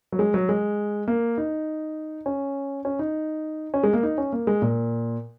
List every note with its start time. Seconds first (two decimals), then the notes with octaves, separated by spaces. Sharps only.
0.12 F#3
0.19 G#3
0.34 F#3
0.49 G#3
1.08 A#3
1.37 D#4
2.26 C#4
2.85 C#4
2.99 D#4
3.74 C#4
3.83 G#3
3.93 A#3
4.03 D#4
4.18 C#4
4.33 A#3
4.47 G#3
4.62 A#2